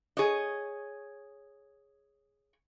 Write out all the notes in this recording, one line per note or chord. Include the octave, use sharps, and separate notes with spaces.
G#4 C#5 D#5